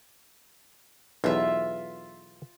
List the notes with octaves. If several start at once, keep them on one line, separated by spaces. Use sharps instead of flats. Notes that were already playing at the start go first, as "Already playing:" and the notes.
B1 E2 F4 E5